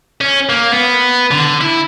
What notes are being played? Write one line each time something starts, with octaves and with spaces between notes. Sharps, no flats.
C#4
A#3
B3
D3
E4